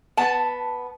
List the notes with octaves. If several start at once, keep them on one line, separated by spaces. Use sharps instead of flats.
B3 A5